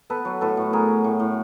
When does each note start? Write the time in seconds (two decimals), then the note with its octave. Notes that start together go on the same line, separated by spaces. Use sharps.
0.10 B3 A4 B4
0.25 F#3
0.41 A2 A4 B4
0.57 A2
0.73 B3 G#4 A#4
0.88 F#3
1.04 A2
1.20 A2